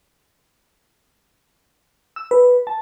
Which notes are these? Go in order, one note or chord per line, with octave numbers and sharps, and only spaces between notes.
E6
B4
A5